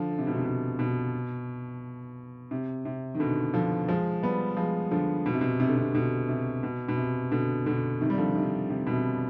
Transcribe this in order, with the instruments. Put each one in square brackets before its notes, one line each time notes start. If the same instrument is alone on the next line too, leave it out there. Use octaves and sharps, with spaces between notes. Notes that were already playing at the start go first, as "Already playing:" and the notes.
Already playing: [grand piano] D3 F3
D3
C3
B2
C3
B2
B2
C3
C3
D#3
B2 D3
D3 F3
F3 G#3
G3 B3
F3 G#3
D3 F3
B2
C3
B2
C3
D3
C3
B2 D3
C3
B2
B2
C3
B2 D3
B2 D3
C3 D#3
G3
D3 F3
C3 D#3
C3
B2
C3